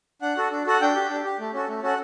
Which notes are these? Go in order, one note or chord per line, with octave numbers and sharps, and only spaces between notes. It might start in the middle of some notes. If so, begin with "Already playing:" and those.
D4 F#5
F#4 A4
D4
F#4 A4 F#5
D4 G5
G4
D4
G4
A3
C#4 F#4 A4
A3
C#4 F#4 A4 F#5